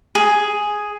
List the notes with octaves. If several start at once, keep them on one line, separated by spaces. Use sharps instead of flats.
G#4